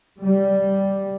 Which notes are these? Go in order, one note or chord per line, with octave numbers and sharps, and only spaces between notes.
G3